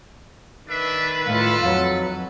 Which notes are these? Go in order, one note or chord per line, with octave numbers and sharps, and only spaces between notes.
D#3 D4 B4 E5
A2 F4 A4 F5
F2 F#3